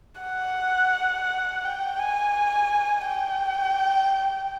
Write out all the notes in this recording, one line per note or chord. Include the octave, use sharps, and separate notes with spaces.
F#5
G5
G#5
G5